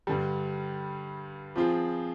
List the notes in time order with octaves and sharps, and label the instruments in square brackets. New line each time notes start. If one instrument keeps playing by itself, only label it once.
[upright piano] G2 D3 G3
F3 C4 F4 G#4